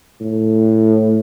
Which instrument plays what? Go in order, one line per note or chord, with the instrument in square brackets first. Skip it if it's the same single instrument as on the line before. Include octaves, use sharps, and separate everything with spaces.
[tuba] A2